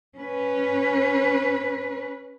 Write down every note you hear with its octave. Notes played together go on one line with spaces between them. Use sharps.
C#4 B4